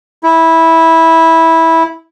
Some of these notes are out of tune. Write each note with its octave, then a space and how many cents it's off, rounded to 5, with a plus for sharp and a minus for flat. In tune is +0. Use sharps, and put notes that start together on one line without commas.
E4 -15